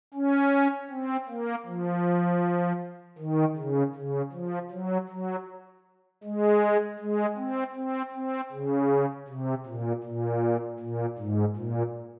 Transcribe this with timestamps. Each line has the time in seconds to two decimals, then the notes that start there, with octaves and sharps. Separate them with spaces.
0.14 C#4
0.90 C4
1.29 A#3
1.66 F3
3.18 D#3
3.56 C#3
3.95 C#3
4.32 F3
4.71 F#3
5.09 F#3
6.24 G#3
6.99 G#3
7.37 C4
7.75 C4
8.14 C4
8.52 C#3
9.28 C3
9.66 A#2
10.03 A#2
10.79 A#2
11.18 G#2
11.56 A#2